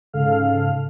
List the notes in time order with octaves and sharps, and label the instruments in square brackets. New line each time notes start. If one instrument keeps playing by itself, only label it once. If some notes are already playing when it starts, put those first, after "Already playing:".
[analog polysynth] G#2 C#3 A4 F5 F6